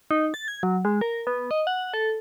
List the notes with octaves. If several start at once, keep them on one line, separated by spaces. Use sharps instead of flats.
D#4
A6
G#6
F#3
G#3
A#4
B3
D#5
F#5
A4